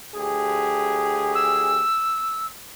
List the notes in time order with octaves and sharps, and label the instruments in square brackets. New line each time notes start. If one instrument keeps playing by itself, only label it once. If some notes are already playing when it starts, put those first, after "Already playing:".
[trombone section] D2 G4 G#4
[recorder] E6